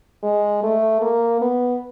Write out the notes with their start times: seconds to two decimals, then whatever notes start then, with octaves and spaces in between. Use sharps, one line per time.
0.23 G#3
0.63 A3
1.01 A#3
1.41 B3